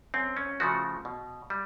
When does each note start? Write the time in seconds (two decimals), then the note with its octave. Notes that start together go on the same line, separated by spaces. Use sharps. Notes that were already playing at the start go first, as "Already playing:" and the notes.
0.14 F#2 C4
0.37 C#4
0.60 C#3 F3 A3 F#4
1.05 B2
1.50 G3